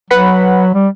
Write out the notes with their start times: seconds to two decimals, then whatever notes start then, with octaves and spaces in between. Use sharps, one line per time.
0.11 F#3 B4 F#5 B5
0.74 G3